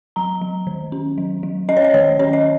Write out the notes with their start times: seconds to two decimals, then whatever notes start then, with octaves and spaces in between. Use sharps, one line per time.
0.16 F#3 A#5
0.41 F#3
0.67 D#3
0.92 C#4
1.18 F#3
1.43 F#3
1.69 C#4 D#5
1.77 C#5
1.84 D#5
1.94 D#3 C#5
2.19 C#4 C#5
2.33 D#5